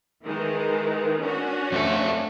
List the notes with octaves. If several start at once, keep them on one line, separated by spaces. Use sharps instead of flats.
D#3 E3 G#3
C#4 D4 F#4
F2 A3 A4